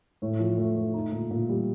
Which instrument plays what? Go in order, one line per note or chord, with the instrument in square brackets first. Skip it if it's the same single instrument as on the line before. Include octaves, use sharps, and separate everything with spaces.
[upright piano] A2
F3
A3
A3
D#4
A#2
A#2
G3